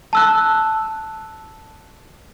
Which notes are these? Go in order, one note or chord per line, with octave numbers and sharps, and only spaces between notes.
A5 E6 F#6